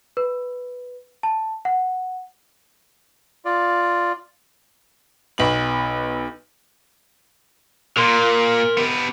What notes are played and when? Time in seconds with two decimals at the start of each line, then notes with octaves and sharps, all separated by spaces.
0.17 B4
1.23 A5
1.65 F#5
3.45 F4 D5
5.38 B1 B3 F#7
7.97 A#2 A#4 C6
8.77 B3 G4